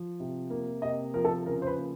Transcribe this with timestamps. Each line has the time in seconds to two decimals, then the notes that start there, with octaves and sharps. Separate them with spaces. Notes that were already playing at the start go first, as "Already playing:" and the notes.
Already playing: F3
0.20 C3
0.50 A#3
0.82 C3 D#5
1.14 F3 A#4
1.25 A4
1.46 C#3 A#4
1.62 C5
1.67 B4
1.78 A#3